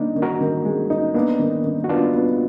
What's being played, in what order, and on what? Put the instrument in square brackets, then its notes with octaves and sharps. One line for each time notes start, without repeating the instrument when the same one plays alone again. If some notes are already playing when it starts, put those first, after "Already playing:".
Already playing: [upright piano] D#3 D#4 [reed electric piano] A#3 D4
[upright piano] D#3
[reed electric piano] F#4 A#4
[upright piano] D#3
G#3
D#4
[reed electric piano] A#3 D4 [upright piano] B3
[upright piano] D#3
D#3
[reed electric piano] F#4
[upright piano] B3 [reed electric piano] D4 F4
[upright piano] B3